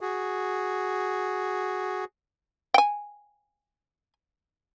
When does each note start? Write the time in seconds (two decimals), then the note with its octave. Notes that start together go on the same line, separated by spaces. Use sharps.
0.01 F#4 G#4
2.74 G5 G#5